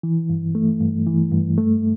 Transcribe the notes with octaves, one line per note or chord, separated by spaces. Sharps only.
E3
G2
A3
G2
E3
G2
A3